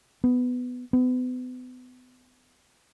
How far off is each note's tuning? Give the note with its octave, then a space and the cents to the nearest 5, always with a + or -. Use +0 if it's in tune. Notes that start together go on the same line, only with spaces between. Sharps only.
B3 +10
B3 +35